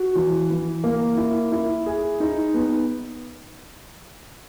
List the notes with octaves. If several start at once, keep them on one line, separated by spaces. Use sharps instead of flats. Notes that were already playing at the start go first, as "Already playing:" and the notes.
Already playing: F#4
E3
E3
A#3
E4
E4
G#4
D#4
B3